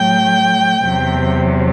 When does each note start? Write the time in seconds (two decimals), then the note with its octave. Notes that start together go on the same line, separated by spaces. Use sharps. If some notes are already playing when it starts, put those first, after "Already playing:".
Already playing: A2 F#3 G5
0.84 E2 C3 F#3